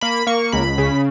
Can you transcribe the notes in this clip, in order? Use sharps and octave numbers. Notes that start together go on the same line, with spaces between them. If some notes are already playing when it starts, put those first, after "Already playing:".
A#3 B5
A#3 C#6
C#2 B5
C#3